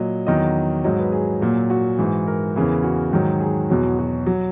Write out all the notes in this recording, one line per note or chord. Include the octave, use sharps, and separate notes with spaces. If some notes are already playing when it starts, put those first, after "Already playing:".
Already playing: A#2 F#3 D#5
E2 D#3 F#3 D#5
G#2 F#3 D#5
B4
G#4
A#2 F#3
F#4
G#2 E3
A#4
E2 C#3 E3
F#4
G#2 D#3 F#3
G#4
E2 B2 F#3
F#4
F#3